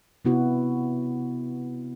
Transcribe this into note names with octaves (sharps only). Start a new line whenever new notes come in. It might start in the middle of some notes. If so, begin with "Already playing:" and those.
C3 B3 E4 F#4